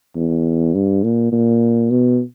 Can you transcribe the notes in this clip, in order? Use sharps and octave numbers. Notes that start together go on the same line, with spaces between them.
E2
G2
A#2
A#2
B2